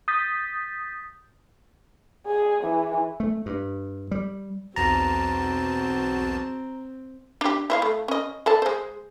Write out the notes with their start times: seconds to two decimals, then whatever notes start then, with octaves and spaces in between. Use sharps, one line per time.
0.08 D#6 G6 A6 B6
2.27 G#4
2.64 E3
3.20 A3
3.46 G2
4.11 G3
4.76 B1 E2 C4 F#4 A5 A#5
7.41 D4 G4
7.70 E4 C5 F5
7.82 A3
8.08 C#4 D#5
8.46 A4 D5 A5
8.62 G#3 C5